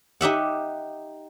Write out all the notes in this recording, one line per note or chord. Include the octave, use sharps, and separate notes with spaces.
D#4 G4 E5 F#5